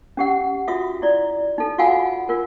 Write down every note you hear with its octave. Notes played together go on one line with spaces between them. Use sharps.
C#4 G4 F#5
F4 F#4 E5 D#6
E4 D5
D#4 A4
F4 F#4 F5 F#5 G#5 B5
F4 A#4